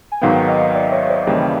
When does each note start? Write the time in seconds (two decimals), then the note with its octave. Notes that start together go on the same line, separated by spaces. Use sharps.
0.12 G#5
0.22 G#1 G#2 D#3 F#3 B3 F5 G5
0.48 D#5 F5
0.70 F5
0.75 D5 E5
0.92 C#5 D#5
1.10 C5 D5
1.27 D#2 C#3 E3 G3 A#3